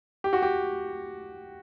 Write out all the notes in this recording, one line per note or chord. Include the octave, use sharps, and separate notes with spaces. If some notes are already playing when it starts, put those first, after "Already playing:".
G4
F#4
G4